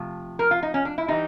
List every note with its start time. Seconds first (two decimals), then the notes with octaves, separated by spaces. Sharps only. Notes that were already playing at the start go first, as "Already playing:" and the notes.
Already playing: C3 F3 A3
0.39 A#4
0.51 F4
0.63 D#4
0.74 C#4
0.85 D4
0.98 E4
1.08 E3 G3 D#4